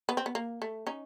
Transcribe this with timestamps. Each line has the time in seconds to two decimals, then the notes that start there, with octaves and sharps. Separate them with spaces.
0.09 B3
0.17 C4
0.26 B3
0.35 A#3
0.62 A3
0.87 C#4 D#4